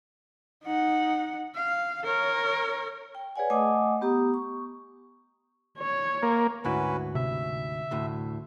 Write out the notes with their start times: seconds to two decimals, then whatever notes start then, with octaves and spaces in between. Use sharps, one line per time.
0.64 D#4 F#5
1.56 F5
2.04 A#4 C#5
3.15 G5
3.36 G#4 B4 C#5 D5 F#5 G#5
3.50 A3 D#5 F#5 G#5 D6 D#6
4.01 B3 G4 A#5 D#6
4.34 C#6
5.78 C#5
6.23 A#3
6.65 D2 G#2 C#4 E4 F#4 B4
7.15 C3 E5
7.91 D2 A2